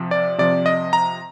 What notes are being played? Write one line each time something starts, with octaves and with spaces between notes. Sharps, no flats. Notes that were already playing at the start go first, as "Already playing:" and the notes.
Already playing: C3 F3
D5
C3 F3 D5
D#5
A#5